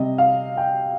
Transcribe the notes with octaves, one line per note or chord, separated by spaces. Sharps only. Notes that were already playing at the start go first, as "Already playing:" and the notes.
Already playing: C3 G3 C4 D#5
F5
G5